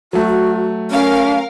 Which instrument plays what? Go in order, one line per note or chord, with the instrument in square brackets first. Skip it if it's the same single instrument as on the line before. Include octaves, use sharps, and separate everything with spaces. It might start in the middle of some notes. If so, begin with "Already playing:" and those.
[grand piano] F#3 A3 [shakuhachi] F#4
[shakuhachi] C#4 [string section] A#4 F5